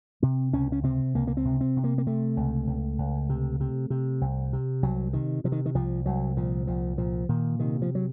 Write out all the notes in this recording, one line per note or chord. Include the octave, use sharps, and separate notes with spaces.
C3 C4
C#2 C#4
C#4
C3 C4
C#2 A#3
A#3
C4
C3
C4
C3
A#3
A#3
C3 A3
C#2
C#2
C#2
C3
C3
C3
C2
C3
C2 F#3
C3 D#3
C3 F3
D#3
D#3
C2 F3
C2 F#3
A#2 F3
C2 F3
A#2 F3
A#2 D#3
C3 D#3
F3
F#3